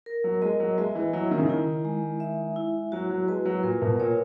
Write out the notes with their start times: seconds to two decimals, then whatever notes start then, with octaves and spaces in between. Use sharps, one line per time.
0.06 A#4
0.24 F#3
0.42 G#3 D#5
0.60 F#3
0.78 G#3 E5
0.95 E3
1.13 F#3 E4
1.31 D#3
1.38 C#3
1.46 D#3 E4
1.85 G#3
2.20 E5
2.56 E4
2.92 F#3 F#4
3.10 F#3
3.28 G#3 B4
3.45 F#3
3.63 A#2 A#4
3.82 B2
4.00 A#2 C#5